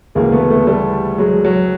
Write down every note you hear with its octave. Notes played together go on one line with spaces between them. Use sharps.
D2 C#3 E3 G#3 A#3
A3 B3
A3 B3
G3 A3
F#3 G#3
F#3